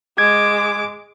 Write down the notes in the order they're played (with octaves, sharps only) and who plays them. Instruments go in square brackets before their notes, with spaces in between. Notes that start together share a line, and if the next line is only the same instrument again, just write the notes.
[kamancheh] G#3 D6 [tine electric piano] G#6